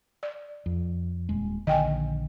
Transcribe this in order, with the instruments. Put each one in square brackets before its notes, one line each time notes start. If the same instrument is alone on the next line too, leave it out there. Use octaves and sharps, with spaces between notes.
[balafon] D5
[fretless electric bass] F2
D#1 G#3
[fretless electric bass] A#1 D3 D#3 [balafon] D#5 G5 G#5